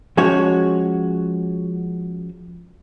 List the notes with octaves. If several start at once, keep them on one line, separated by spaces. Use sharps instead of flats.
F3 G#3 C#4 F#4 C#5